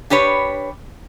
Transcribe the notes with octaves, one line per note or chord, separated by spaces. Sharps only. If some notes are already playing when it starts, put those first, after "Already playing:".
D4 G4 B4 C#5